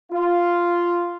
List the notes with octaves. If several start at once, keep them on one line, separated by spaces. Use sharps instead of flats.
F4